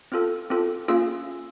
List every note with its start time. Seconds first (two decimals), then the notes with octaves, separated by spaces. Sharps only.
0.12 C4 F4 A4 F6
0.50 C4 F4 A4
0.88 A#3 C#4 F4 G#4 E6